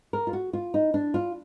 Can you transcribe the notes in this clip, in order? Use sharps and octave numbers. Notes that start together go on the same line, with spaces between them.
A#4
F4
F#4
F4
D#4
D4
F4